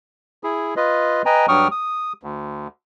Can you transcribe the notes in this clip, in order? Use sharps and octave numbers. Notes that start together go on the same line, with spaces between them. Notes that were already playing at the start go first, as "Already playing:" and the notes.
E4 G#4
F4 B4 D#5
B4 D#5 G5 G#5 A#5
G2 F#3 G5 C#6 D#6 F6
D#6
D2